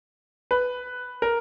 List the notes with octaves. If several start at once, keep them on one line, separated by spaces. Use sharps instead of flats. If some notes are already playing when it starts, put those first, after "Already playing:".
B4
A#4